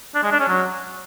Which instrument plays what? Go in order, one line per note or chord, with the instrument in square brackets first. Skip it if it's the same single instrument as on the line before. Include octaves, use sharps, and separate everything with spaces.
[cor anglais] D4
G#3
D4
C#4
F#3